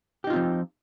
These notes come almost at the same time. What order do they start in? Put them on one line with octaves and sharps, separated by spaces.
G4 D#4 F4 C4 F3